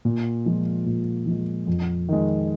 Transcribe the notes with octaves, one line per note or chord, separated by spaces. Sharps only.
A#2
F3 G#3
A#2
F3 G#3
F2
D#3 G#3